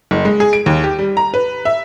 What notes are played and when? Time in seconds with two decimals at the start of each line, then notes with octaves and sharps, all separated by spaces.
0.11 F#1
0.25 G#3
0.40 G#4
0.53 D7
0.66 D#2
0.84 G4
0.99 G3
1.17 A#5
1.34 B4
1.65 E5